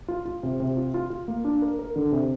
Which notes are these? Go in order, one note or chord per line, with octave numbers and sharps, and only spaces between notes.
F4
F4
C3
C3
F4
F4
F4
A#3
D4
A#4
A#4
D3
C3